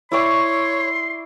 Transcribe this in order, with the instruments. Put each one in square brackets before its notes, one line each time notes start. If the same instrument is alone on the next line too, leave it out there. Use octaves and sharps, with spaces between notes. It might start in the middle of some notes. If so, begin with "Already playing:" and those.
[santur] E4 D5 C#6 [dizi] C#5 [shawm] C6